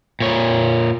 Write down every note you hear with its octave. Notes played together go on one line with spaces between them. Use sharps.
A#2 C#5